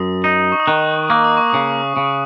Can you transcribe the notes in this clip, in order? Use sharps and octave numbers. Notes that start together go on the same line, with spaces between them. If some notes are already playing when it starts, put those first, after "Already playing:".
Already playing: F#2 D#6
D#4
C#6
D#6
D#3 F#6
A#3 F#6
D#6
C#6
C#3 D#6
C#3